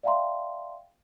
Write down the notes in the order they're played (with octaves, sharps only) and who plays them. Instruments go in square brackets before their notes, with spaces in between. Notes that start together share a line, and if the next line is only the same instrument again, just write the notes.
[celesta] D5 E5 F5 G5 A#5 C6